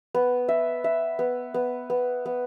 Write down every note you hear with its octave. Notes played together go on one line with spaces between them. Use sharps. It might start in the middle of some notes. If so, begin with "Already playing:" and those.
B3
E5
E5
B3
B3
B3
B3